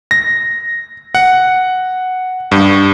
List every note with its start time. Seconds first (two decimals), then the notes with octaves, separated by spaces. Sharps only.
0.11 A#6
1.15 F#5
2.51 G2